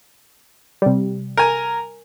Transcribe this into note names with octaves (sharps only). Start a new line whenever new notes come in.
C3 G3
A#4 G#5